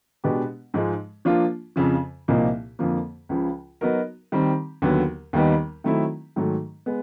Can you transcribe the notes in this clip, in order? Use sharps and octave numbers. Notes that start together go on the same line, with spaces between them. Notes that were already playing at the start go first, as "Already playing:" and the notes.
B2 G#3 B3 D4 G4
G#2 F3 G#3
F3 A#3 D4 F4
F2 C#3 F3
C2 A#2 F3 A#3 D#4
F2 D3 F3 A#3
C#2 C#3 F3
F#3 B3 D#4 F#4 A#4
D#3 G3 C4
D#2 D3 F#3 B3
D#2 D#3 G3 B3 D#4
D#3 F#3 A3 C4 E4
G#2 D#3 F#3 A3
G#3 B3